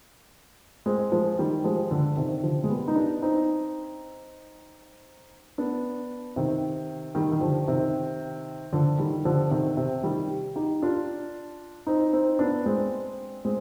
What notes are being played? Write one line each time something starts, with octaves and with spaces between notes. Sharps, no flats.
G#3 C4
F3 G#3
D#3 G3
F3 G#3
D3 F3
C3 D#3
D3 F3
G#3
G3 B3
D#4
B3 D4
C4 D#4
B3 D4
C3 D#3
D#3 G3
D#3
D3 F3
C3 D#3
D3 F3
D#3 G3
D3 F3
C3 D#3
C3
D#3 G3
D#4 G4
D4 F4
C4 D#4
C4 D#4
B3 D4
G#3 C4
G#3 C4